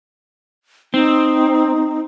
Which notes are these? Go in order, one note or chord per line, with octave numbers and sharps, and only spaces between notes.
C4 D#4